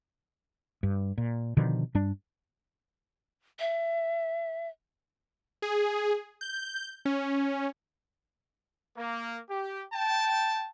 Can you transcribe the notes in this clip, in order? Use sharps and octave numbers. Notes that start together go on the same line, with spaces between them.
G2
A#2
B2 D3 D#3 F3
G2 G3 D4
E5
G#4
G6
C#4
A#3
G4
G5 A5